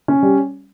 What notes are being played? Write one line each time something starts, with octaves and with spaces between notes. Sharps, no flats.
C#4
G3